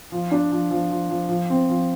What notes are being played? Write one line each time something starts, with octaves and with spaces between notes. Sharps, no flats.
F3
D4
F3
F3
F3
F3
F3
C4
F3